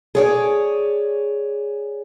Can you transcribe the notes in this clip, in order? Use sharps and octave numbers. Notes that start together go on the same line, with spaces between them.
G#4 C#5 D5